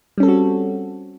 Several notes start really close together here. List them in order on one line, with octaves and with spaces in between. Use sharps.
G3 C#4 A4 C4 F#4